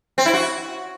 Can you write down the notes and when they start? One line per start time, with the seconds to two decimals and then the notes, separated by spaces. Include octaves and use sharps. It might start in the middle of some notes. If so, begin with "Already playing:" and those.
0.18 C4
0.26 E4
0.33 F#4